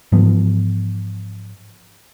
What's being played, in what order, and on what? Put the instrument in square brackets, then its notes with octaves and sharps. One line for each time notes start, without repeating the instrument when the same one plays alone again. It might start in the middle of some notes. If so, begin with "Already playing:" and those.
[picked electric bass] G#2 E3 F3 B3